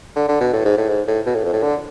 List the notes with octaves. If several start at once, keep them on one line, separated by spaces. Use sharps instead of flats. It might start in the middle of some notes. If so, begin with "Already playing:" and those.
D3
D3
B2
A2
G#2
A2
G#2
A2
B2
A2
F2
A2
D3